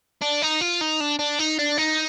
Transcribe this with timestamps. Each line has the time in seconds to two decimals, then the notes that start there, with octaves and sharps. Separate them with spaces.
0.22 D4
0.42 D#4
0.61 F4
0.81 D#4
1.01 D4
1.19 D4
1.39 D#4
1.59 D4
1.78 D#4